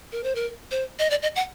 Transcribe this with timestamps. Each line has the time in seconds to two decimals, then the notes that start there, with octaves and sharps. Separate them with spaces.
0.12 A#4
0.24 C5
0.35 A#4
0.71 C5
0.99 D#5
1.10 D5
1.22 D#5
1.36 F#5